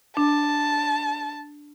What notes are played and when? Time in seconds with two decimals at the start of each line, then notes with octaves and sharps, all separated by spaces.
0.17 D4 A5